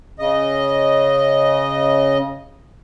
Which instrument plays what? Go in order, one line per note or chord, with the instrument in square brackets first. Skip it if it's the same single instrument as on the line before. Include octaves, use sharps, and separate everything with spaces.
[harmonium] C#3 D#5